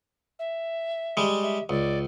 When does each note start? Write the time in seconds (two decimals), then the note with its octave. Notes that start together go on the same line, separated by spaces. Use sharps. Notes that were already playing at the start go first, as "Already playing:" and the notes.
0.39 E5
1.17 G3 G#3
1.43 E5
1.69 C#2 D5